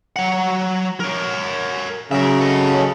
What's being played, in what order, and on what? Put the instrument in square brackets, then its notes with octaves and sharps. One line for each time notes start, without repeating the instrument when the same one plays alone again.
[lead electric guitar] F#3 F#5
A#4 C#5
[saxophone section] C#3 F#3 [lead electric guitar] A#4 E5
[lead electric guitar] A4 D#5